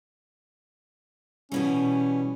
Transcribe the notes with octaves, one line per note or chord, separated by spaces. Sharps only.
B2 E3 G3 C#4